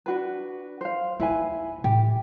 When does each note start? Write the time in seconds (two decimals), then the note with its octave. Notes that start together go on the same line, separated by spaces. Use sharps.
0.06 D4 F#4 B4
0.81 C5 F5
1.20 D#1 D#4 E4 B4 G#5
1.84 A2 G4